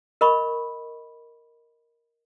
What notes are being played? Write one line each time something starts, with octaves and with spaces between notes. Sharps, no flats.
A#4 D#5 B5 C#6